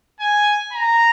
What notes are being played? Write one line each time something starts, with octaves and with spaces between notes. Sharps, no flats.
G#5
A#5